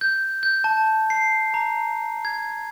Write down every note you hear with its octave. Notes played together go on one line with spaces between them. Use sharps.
G6
G6
A5
C7
A#5
G#6